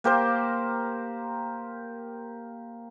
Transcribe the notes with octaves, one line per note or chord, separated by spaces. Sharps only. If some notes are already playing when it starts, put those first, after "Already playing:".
A#3 G4 A#4 C5